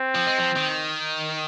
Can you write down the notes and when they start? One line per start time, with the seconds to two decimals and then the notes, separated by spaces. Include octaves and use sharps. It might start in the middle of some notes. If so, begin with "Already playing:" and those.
Already playing: C4
0.15 F3
0.27 G#3
0.38 F3
0.56 D#3